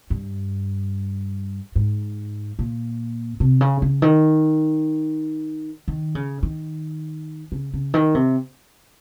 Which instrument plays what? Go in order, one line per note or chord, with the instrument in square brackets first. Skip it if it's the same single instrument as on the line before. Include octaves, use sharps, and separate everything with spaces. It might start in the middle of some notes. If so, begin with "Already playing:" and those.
[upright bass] G2
G#2
A#2
C3
C#3
C#3
D#3
D#3
C#3
D#3
C#3
C#3
D#3
C3